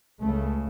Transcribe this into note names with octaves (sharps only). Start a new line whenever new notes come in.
C#2 C#3 A3